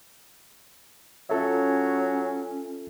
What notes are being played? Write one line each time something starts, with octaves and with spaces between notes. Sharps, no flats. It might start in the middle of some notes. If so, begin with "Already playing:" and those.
F#3 C#4 F4 A4 E5